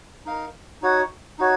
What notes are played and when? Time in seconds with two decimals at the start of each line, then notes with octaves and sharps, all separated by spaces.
0.26 D#4 A#4 F5
0.82 D#4 F#4 C#5 F#5
1.39 D#4 F#4 C#5